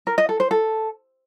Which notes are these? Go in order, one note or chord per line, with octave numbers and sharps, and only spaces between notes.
A#4
D#5
A4
C5
A4